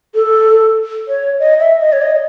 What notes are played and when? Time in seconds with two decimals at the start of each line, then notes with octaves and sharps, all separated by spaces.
0.15 A4
1.08 C#5
1.39 D#5
1.60 E5
1.80 D#5
1.92 C#5
2.02 D#5